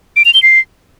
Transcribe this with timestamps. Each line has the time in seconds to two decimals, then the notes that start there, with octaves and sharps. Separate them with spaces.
0.16 D7
0.25 F7
0.34 G7
0.43 C7